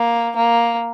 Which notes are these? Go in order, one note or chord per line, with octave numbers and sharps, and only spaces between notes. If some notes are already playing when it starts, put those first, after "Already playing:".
Already playing: A#3
A#3